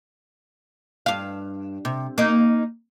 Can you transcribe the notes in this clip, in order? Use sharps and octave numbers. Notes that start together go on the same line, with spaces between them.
G2 F5
C3
A#3 D#4